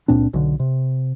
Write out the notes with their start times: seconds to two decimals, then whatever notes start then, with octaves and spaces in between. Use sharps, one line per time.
0.08 C#2 A#2 C4 D4
0.34 B1 D3
0.60 C3